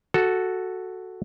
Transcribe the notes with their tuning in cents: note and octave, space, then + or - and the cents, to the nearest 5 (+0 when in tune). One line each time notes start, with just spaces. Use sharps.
F#4 +0 A4 +0